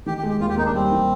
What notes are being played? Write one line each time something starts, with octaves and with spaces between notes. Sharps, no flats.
D#3 G4
G4
G#3
G4
D#2 F4
G4
A#3 D#4
D4
G3 C4
D#3